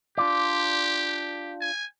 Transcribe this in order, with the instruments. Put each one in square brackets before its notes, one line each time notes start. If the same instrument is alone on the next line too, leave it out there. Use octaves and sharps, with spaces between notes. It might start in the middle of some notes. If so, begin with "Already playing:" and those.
[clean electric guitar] D4 F4 D5 [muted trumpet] G4
[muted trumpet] G#5